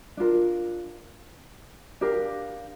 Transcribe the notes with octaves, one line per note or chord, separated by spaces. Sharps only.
D4 F4 A#4
D4 G4 A#4 F5